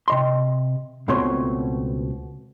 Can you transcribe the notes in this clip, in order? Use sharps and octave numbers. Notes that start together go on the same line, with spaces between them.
C3 D#5 C6
C#2 B2 A3 C4 C#5 C6